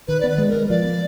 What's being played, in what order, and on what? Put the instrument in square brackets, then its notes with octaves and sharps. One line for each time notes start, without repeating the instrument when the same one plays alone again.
[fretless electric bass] D#3 [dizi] B4
[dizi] D5
[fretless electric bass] B3
[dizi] B4
[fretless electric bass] G#3
[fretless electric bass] G#3 [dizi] A#4
[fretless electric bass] F3 [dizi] D5
[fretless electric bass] B3